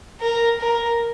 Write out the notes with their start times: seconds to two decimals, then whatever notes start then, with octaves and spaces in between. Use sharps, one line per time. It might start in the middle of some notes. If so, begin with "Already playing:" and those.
0.21 A#4
0.60 A#4